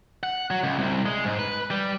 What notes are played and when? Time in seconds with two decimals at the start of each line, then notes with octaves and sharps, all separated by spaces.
0.23 F#5
0.51 F#3
0.63 C#2
0.79 C2
1.06 G#3
1.25 G#2
1.39 B4
1.70 G3